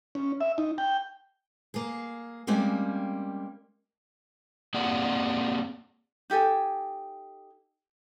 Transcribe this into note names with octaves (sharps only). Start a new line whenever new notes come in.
C#4
E5
D#4
G5
A#3 G#4
G3 G#3 A#3 C4 C#4
A#3 C4 G#4 D5 F#5
D#4 G4 A4 G#5